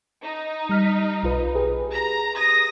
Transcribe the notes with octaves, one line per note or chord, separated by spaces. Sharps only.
D#4
G3 F6 B6
B1 F4 B4
G4 G#4 B4
A#5
D#6 A#6